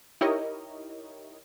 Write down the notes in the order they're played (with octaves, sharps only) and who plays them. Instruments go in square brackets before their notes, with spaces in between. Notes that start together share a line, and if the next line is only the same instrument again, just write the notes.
[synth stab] D#4 E4 G4 A#4 C#5 D#5